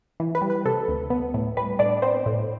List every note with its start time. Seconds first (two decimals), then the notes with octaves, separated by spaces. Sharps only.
0.20 E3
0.35 B4
0.42 G3
0.50 B4
0.66 C3 A4
0.88 D2
1.10 B3
1.34 A2
1.57 G3 B4
1.79 A2 D4 D5
2.02 B3 C4 C5
2.26 A2